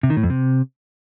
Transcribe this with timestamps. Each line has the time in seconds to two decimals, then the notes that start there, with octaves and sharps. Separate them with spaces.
0.03 C3
0.10 D#3
0.17 A2
0.23 F2
0.30 C3